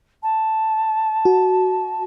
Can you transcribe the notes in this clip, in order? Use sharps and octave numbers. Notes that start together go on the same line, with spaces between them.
A5
F#4